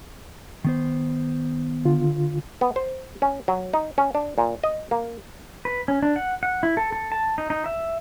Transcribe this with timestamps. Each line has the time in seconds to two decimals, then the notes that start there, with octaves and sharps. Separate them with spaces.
0.64 D#3 B3 C5
1.85 D3 F4
2.61 B3
2.76 C5
3.22 C#4
3.48 F#3
3.73 D#4
3.98 C#4
4.15 D4
4.38 A#2
4.63 D#5
4.91 A#3
5.65 B4
5.88 C#4
6.03 D4
6.16 F#5
6.43 F#5
6.63 E4
6.77 A4
6.92 A4
7.12 A5
7.38 D#4
7.50 D#4
7.66 E5